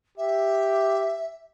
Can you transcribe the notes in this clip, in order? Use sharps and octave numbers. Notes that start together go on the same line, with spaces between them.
G4 E5